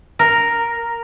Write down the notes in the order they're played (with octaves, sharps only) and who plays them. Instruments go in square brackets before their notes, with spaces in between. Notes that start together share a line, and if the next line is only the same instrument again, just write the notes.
[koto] A#4